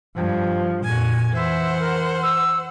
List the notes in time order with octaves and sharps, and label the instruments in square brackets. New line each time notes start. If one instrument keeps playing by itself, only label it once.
[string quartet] G2 [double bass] F3
[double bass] F2 A#2 [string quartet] F#4 G#5
[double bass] E3 [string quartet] C5 F#5 [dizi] E5
[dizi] A#4
E6